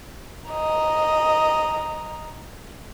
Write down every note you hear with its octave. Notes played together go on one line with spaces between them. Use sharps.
D#5 A#5